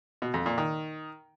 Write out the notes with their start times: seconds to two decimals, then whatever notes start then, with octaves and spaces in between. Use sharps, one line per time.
0.22 B2
0.34 F2
0.46 A#2
0.58 D#3